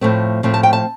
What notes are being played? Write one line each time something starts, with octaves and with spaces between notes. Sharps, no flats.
A2 F3 A3 C4
A2 F3 A3 C4
A5
G5
A5